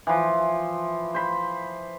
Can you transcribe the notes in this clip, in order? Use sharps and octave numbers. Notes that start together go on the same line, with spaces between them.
E3 F3
C5 B5